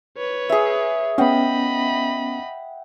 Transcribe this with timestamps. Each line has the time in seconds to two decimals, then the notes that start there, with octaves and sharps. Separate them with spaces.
0.17 B4 C#5
0.49 G#4 E5
1.18 B3 C#4 D#5 F#5 G5 B5